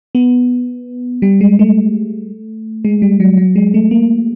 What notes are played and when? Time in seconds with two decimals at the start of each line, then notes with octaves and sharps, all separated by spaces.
0.15 B3
1.22 G3
1.41 G#3
1.59 A3
2.85 G#3
3.02 G3
3.20 F#3
3.37 F#3
3.56 G#3
3.74 A3
3.91 A#3